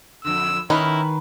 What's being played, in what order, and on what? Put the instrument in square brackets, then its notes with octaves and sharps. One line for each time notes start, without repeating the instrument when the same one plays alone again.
[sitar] F2 D3 [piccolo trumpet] E6
[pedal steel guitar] D#3 [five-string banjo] C#4 D#4 A#4 [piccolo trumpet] E4 [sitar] B4